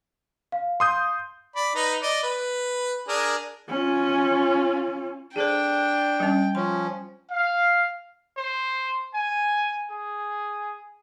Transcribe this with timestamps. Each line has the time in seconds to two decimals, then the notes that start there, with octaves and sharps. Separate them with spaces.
0.52 F5
0.80 C6 D#6 G6
1.56 D5 B5
1.75 D#4 B4 A#5
2.02 D5 D#5
2.23 B4
3.08 D4 G#4 A#4
3.69 C#4 F4
5.36 D4 G#4 A4 C5 G5
6.20 G3 C#4
6.55 F3 C#4 C6
7.31 F5
8.37 C5
9.14 G#5
9.90 G#4